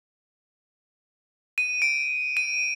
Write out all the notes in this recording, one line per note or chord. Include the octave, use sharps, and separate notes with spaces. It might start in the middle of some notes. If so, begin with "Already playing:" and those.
D#7
D7
D#7